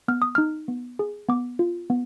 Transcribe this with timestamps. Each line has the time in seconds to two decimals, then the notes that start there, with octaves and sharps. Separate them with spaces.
0.08 B3 F6
0.22 D#6
0.35 D#4 F6
0.68 B3
0.99 G#4
1.29 B3 D6
1.59 F4
1.90 B3